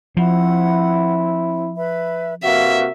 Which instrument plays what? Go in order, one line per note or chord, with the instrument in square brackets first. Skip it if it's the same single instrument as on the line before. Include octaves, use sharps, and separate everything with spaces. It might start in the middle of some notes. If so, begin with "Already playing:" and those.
[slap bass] F3 [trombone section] C4 E4 [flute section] F#5
[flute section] B4 E5 B5
[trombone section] C3 A#3 F#4 [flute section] B4 F5 [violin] E5